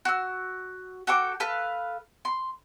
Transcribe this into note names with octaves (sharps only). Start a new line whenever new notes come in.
F#4 E6
F#4 A4 G5 D6
A4 B4 F5
C6